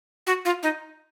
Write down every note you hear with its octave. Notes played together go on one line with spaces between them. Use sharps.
F#4
F4
D#4